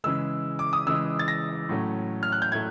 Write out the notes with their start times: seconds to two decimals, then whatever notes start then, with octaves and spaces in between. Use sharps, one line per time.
0.04 C#3 E3 G#3 E6
0.59 D6
0.73 D#6
0.86 C#3 E3 G#3 E6
1.19 A6
1.28 A#6
1.69 A2 F#3 A3 C#4
2.23 F6
2.32 F#6
2.42 G6
2.52 A2 F#3 A3 G#6